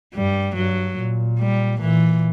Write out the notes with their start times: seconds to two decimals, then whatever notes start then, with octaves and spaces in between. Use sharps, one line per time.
0.14 G2 G3
0.56 G2 F#3
0.97 A#2
1.39 G3
1.81 A#2 E3